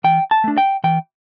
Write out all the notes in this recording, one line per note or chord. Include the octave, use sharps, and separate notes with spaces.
E3 G5
A5
A3 D4
G5
E3 G5